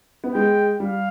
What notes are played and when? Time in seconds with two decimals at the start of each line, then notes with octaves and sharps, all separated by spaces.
0.24 B3
0.34 G#3 G5
0.80 G3 F5